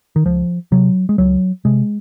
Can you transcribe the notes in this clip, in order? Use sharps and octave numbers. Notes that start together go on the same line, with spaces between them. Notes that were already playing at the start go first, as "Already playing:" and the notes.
D#3
C#2 F3
C3 F#3
G#3
C#2 F#3
C3 G#3